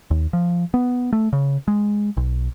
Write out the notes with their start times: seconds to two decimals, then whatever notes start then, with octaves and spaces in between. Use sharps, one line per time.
0.11 D#2
0.33 F3
0.74 B3
1.13 A3
1.33 C#3
1.68 G#3
2.17 B1